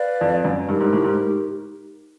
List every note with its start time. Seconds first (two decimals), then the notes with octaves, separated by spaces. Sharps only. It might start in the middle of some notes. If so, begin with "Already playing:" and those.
Already playing: B4 D5 F5
0.21 F2
0.45 F#2
0.69 G2 D#4 G4 A#4
0.80 G#2
0.93 A2
1.04 G#2